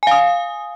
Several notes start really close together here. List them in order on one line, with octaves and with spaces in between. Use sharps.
G#5 F5 D#6